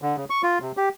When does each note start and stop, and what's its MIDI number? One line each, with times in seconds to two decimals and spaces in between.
0.02 0.16 50
0.17 0.25 49
0.30 0.42 85
0.43 0.59 65
0.62 0.72 48
0.77 0.89 67